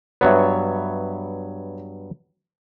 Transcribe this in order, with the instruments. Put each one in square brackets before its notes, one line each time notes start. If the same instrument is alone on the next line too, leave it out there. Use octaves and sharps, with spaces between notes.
[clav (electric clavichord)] G2 F#3 B3 [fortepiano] C#5 E5